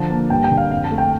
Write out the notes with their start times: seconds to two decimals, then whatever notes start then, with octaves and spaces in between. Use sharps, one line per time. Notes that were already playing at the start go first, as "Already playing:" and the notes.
Already playing: D3 F3 A5
0.10 A#3
0.30 G2 G5
0.44 G5
0.51 D3
0.58 F5
0.71 F2 F5
0.84 A5
0.91 A3
0.98 G5